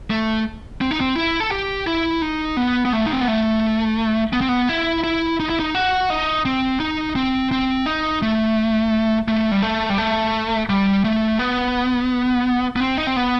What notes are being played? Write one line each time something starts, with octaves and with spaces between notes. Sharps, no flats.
A3
C4
D#4
C4
E4
A4
G4
E4
D#4
B3
B3
A3
D#4
C4
B3
A3
B3
C4
B3
E4
E4
D#4
E4
D#4
F#4
D#4
C4
D#4
C4
C4
D#4
A3
A3
G3
A3
G3
A3
G3
A3
B3
B3
C4
D#4
C4
B3